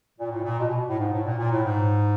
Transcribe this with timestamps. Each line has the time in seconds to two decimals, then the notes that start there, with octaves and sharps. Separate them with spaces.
0.19 A#2
0.31 A2
0.44 A#2
0.59 B2
0.69 B2
0.89 A2
0.99 G#2
1.12 A2
1.25 A#2
1.38 A#2
1.52 A2
1.65 G#2